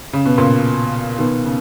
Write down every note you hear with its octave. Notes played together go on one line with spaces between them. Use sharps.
C#3
B2
A#2 C#3
B2 D#3
C#3